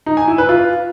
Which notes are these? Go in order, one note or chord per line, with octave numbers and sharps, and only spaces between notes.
D#4
G#5
E4
B4
F4